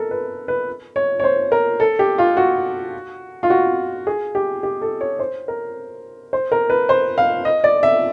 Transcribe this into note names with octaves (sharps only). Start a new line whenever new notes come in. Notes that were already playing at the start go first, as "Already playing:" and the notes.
Already playing: A4 A#4
B4
B4
C#5
C#5
C5
A#4
A4
G4
F4
F#4
F4
F#4
G#4
G4
G4
A4
C#5
C5
A#4
C5
A#4
B4
C5
F5
D#5
D5
E5